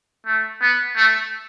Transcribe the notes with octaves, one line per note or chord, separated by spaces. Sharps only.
A3
B3
A3